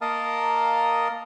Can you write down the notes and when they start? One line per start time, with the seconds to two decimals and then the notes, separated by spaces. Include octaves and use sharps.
0.01 A#3 A#4 D#5 F5 A5 D#6